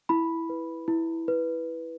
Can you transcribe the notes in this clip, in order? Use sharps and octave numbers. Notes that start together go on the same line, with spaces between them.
E4 B5
B4
E4
B4